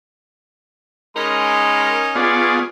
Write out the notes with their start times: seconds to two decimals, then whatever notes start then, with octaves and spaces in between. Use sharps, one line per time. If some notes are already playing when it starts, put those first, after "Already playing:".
1.16 G#3 C#4 D#4 A#4 B5 C6
2.15 B3 F4 G#4 D5 C#6 D6